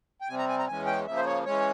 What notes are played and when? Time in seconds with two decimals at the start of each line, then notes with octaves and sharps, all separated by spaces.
0.21 G5
0.28 C3 G3 C4 G#5
0.38 A#5
0.49 G#5
0.59 A#5
0.68 E2 E3 G#3 C#4 G#5
0.86 G5
1.06 C#3 F3 A#3 E5
1.16 C5
1.25 C#5
1.45 E3 G#3 C#4 C#5